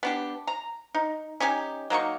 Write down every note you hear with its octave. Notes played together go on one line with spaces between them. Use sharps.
B3 D4 G4
A#5
D#4
C#4 D#4 G4 G#5
F#3 A#3 D#4 C#6